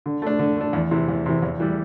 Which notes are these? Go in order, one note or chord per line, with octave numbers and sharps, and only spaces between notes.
D3
A3 D4
D3
A3 D4
E2
C3 E3
E2
C3 E3
E2
E3 G3